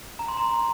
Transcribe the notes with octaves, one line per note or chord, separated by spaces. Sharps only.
A#5
C6
A#5